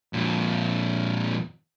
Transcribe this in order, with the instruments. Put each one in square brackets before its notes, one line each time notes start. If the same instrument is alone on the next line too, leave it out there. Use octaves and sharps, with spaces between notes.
[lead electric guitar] F2 A#2